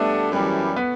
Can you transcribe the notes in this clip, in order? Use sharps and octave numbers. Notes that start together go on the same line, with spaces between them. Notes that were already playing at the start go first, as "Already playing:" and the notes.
Already playing: G3 A3 B3 D4 A4
F#2 E3 G3
B3